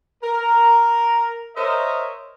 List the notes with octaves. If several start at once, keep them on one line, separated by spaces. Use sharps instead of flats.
A#4
A#4 C5 C#5 D#5 E5